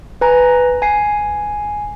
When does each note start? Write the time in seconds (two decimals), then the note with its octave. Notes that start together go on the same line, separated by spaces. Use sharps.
0.21 B4 G#5 A#5
0.82 G#5 C7